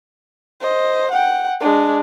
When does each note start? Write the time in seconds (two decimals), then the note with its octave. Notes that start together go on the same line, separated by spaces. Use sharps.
0.61 C5 D#5
1.11 F#5 G5
1.60 G#3 D4